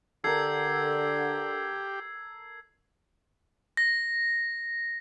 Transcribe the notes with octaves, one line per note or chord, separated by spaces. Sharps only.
D3 G4 A4 A#4 E6 G#6 C7
A#6